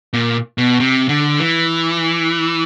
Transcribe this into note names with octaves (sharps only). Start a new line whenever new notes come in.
A#2
B2
C3
D3
E3